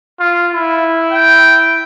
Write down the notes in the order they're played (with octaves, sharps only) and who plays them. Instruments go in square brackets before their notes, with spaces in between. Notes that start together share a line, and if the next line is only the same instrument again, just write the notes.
[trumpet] F4
E4
[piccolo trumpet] G5